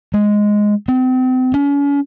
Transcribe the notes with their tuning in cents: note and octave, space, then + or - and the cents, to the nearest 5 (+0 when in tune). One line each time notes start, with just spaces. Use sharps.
G#3 +0
C4 -35
C#4 +40